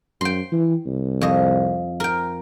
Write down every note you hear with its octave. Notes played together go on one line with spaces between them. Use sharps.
F#2 G5 C6
E3
C2
F2 D#5
A#4 G5